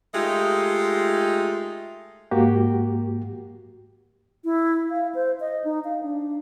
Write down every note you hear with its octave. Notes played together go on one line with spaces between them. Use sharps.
G#3 A3 D#4 F4 G4
G#2 A#3 F#4 G4
E4
F5
C5
D#5
D#4
F5
D4